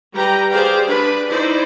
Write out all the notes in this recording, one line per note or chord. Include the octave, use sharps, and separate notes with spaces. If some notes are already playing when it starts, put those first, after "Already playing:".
G3 G4 B4 G5 A#5
G4 G#4 C5 D5 F5 G5
D4 B4 B5
D#4 E4 C5 D5